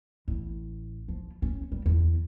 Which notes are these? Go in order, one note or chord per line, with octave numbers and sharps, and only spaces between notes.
A1
F3
C#4
G3
E2